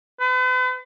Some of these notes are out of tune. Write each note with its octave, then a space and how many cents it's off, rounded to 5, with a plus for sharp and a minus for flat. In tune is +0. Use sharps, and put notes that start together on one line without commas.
B4 +45